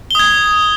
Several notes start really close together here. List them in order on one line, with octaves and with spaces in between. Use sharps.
G7 D#6 G#6